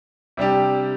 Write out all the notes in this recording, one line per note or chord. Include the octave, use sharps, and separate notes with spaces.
C3 G3 D4 G4